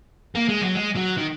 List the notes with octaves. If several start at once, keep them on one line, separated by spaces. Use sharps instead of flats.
A#3
G#3
F#3
G#3
F#3
D#3